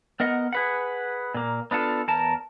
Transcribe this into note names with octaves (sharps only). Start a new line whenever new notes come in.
B3 A#4 D#5 F#5
G#4 B4 F#5
A#2 A#3
B3 D4 F4 A4
E2 A#4 A5